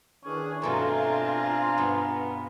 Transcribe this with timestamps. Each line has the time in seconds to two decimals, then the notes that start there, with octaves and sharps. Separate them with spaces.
0.24 E2 D#3 C#4 D4 G#4
0.62 G2 B2 A3 C4 D4 F4 G#5 A#5
1.78 G2 B3